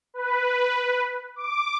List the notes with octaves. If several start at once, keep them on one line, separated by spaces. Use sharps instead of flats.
B4
D6